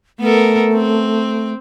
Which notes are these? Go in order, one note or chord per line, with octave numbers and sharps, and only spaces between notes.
A3 B3 A4 A#4
C4